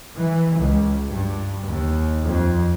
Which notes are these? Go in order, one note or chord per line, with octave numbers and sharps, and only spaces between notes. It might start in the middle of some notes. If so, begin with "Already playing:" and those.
E3
C#2
G2
D#2
F2